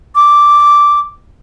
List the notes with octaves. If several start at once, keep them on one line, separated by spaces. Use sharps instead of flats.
D6